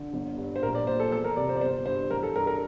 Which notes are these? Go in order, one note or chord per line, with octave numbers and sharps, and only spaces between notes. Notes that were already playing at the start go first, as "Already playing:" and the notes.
Already playing: D3
G1
G2
C5
A#1 A#4
D5
A#2 C5
A4
E2 A4
A#4
C3 D5
C5
D5
G1 C5
G2 C5
A1 A#4
A4
G2 A#4
A#4